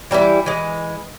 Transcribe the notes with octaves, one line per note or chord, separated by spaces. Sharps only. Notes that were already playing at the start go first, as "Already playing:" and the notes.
E3 G3 D#4 E4
E3 G#3